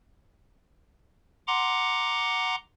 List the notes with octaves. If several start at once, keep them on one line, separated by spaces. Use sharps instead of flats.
F#5 A#5 C6 D6